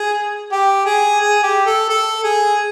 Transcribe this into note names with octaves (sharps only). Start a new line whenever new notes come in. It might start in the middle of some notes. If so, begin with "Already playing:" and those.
Already playing: G#4
G4
G#4
G#4
G4
A4
A4
G#4